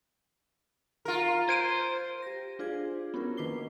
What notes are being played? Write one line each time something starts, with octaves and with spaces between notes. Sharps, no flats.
F4 A#4
C5 G#6 D7 D#7
G4 A#6
D4 F4 G#4 C5 G#6
B3 C#4 E4 F#4 A#4
D#3 A#3 B4 D6 C7 G7